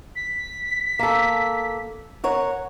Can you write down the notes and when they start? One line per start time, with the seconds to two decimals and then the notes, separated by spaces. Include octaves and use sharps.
0.15 B6
0.99 A#3 A4
2.24 A#4 C#5 F#5